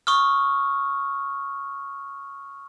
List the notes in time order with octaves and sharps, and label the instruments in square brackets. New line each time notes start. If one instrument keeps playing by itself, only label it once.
[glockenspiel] C#6 D#6 F6